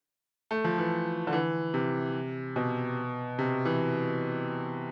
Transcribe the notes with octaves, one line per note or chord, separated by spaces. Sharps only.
A3
F3
E3
D3
E3
C3
B2
C3
E3